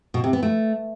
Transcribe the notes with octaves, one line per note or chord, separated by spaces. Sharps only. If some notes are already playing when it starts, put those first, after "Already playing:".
B2
C3
B3
A3